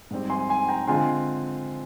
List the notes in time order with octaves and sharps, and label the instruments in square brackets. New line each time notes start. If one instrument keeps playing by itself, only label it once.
[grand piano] G#2 G3 C4
G#5 C6
G#5 C6
G5 A#5
D3 G#3 C4 F4 G#5 C6